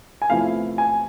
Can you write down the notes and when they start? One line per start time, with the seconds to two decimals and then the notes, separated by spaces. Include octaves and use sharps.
0.22 G#5
0.30 E2 C3 F3 A3 E4 F5
0.78 G#5